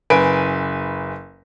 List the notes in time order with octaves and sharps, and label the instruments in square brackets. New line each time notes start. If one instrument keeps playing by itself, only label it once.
[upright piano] F#1 B4 G#5 D7